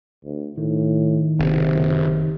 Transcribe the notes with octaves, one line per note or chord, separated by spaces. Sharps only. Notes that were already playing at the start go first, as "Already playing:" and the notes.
D2
A2 D#3
F#1 C3